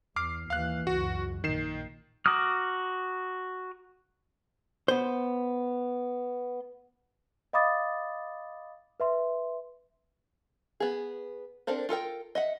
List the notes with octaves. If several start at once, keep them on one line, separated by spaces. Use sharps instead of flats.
E2 D6 F6 C7
D#2 E3 F5 F#6
C#2 F#2 F#4
A#1 D#3 C7 E7
F#4 A#5 D6 D#6 F6
B3 C5
D#5 F5 B5 D6 D#6 A6
B4 E5 C6
B3 G#4
C4 D4 A4 A#4 C5
F4 A4 A#4 G5
D#5 E5 F#5